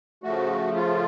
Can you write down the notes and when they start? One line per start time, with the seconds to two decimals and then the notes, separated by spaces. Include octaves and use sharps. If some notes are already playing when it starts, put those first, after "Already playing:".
0.23 C#3 F3 A3 F#4
0.76 F4